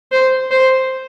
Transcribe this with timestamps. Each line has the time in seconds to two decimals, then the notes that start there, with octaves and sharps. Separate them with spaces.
0.12 C5
0.51 C5